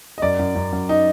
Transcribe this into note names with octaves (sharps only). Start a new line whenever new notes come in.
D#5
F#2 D5
F#2
F#2
F#2
D#4